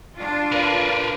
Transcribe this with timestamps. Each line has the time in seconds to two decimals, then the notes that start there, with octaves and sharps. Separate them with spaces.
0.16 D4 F4
0.52 A#4 B4